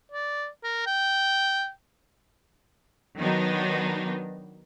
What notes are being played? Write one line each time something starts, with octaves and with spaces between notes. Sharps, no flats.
D5
A#4
G5
D#3 F#3 B3 D4 D#4